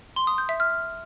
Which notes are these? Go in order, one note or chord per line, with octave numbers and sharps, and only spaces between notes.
C6
D#6
G6
E5
F6